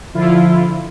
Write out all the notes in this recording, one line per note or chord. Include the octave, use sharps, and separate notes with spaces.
D3 F3 E4 F4